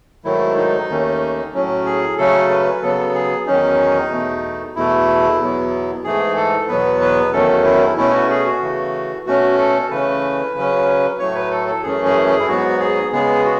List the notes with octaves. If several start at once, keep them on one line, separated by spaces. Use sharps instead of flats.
G#2 D#3 F#3 A3 E4
D#4
D#2 D#3 A3 C#4
A2 F#3 C#4
G#4
C#3 F#3 A3 C#4 A4
B4
C#3 F#3 B3 A4
G#4
E2 D#3 F#3 C#4 D#4
E2 B2 A3
E2 B2 A3 E4
E2 B2 F#3 B3
G#2 E3 A3 G#4
A4
E2 B2 F#3 B3 B4
B4
E2 D#3 F#3 A3 C#4 A4
E4
B2 A3 C#4 E4
F#4
G#4
F#4
C#3 E3 A3
B2 A3 C#4 F#4
A4
C#3 E3 A3 C#4 B4
C#3 F#3 C#4
A2 F#3 A3 C#5
B4
A4
A4
F#2 E3 A3 C#4 G#4
G#4
G#4
E4
G#2 F#3 B3 F#4
G#4
C#3 G#3 B3 G#4
F#4